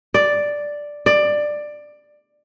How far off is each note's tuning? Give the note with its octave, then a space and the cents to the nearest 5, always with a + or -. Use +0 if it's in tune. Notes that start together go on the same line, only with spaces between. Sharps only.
D5 +0
D5 +15